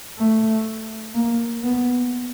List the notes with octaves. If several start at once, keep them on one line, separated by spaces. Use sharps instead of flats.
A3
A#3
B3